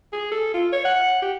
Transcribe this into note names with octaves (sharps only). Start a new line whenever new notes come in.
G#4
A4
F4
C#5
F#5
G4